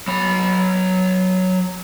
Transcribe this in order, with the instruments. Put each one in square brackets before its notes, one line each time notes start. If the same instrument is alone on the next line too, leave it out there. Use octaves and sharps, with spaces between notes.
[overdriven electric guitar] F#3 B5